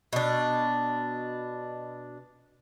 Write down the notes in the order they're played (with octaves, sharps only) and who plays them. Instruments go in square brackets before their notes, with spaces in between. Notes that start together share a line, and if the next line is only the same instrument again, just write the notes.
[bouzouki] B2 D4